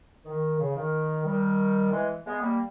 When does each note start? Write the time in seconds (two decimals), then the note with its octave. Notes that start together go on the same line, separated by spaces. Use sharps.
0.25 D#3
0.58 C#3
0.75 D#3
1.24 D#3 G3
1.90 E3 G#3
2.24 G#3 B3
2.40 G3 A#3